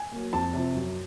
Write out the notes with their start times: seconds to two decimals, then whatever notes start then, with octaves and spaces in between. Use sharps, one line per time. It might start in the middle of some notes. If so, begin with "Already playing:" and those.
Already playing: G#5
0.11 F#3 A#3
0.33 F2 A5
0.53 C3 F3
0.75 F#2